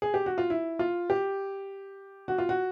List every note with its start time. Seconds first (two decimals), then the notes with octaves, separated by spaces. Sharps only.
0.02 G#4
0.14 G4
0.26 F#4
0.38 F4
0.50 E4
0.79 F4
1.10 G4
2.28 F#4
2.38 F4
2.49 F#4